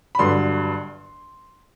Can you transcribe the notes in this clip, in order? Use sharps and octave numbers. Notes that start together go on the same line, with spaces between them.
B5
G1 G2 D3 F#3 C6